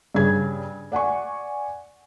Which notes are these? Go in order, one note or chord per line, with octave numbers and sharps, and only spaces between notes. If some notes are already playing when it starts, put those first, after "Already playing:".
G2 C#3 G#6
D5 F#5 G#5 C#6